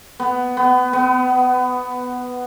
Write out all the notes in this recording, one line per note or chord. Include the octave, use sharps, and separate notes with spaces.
B3
B3
B3